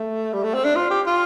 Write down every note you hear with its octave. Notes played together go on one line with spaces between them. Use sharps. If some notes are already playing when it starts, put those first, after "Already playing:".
Already playing: A3
G3
A3
C4
D4
F4
G4
F4